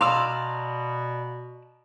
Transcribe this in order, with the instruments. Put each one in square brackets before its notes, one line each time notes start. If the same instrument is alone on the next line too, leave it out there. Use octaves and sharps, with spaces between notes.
[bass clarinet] B2 [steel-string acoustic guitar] D5 F5 [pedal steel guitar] A#5 D6 E6 [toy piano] C6